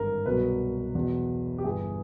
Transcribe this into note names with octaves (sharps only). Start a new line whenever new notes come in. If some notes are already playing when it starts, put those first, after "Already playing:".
Already playing: G#1 G2 D3 A#4
C2 B2 F#3 B4
E2 B2 F#3
G4
G1 G2 E3 G#4